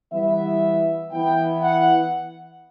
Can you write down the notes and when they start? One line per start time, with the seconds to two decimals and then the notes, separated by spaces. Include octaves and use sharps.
0.13 E3 G3 B3 E4 E5
1.12 E3 B3 E4 G5
1.62 F#5